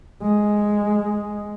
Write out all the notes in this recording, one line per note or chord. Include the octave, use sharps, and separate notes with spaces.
G#3